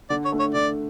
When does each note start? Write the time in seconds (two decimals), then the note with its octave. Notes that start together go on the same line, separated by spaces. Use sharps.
0.10 D3 D5
0.25 C#5
0.32 A3 D4
0.39 C#5
0.54 D3 D5